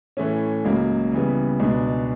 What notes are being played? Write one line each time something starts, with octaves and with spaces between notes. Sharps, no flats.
A2 E3 A3 C#4
C#2 C#3 F#3 A#3
C#3 E3 G3 B3
C#2 B2 G#3 B3 D4